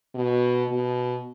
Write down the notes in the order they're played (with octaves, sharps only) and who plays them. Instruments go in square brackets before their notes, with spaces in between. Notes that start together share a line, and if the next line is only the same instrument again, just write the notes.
[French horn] B2
B2